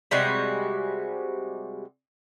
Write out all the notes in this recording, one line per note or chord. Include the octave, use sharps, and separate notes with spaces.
C3 G3 G#3 F#4